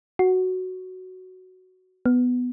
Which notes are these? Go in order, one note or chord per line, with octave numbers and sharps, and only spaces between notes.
F#4
B3